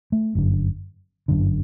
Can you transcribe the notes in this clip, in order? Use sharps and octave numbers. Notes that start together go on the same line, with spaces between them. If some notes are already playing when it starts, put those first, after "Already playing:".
A3
G1 F#2 D3
G1 F#2 D3